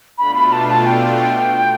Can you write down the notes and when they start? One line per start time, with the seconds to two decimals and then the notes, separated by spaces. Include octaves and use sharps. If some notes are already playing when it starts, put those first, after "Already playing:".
0.18 B2 A3 D4 F4 B5
0.35 B5
0.52 A5
0.69 A5
0.86 G5